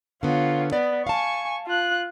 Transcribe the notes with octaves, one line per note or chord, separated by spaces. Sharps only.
D3 B3 F4 C#5
B3 D5
F5 G#5 A5 C#6
F4 F#6